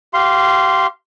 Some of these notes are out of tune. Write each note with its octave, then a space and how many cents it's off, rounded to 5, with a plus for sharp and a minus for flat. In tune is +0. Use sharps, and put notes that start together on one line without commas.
G4 -35 F5 -20 C6 +0